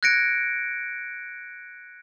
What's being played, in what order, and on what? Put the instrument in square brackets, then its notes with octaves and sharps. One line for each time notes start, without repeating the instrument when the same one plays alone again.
[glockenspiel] F#6 G#6 A#6 C#7 D7